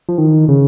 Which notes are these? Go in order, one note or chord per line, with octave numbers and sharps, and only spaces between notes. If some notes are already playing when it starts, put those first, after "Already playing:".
F3
D#3
C#3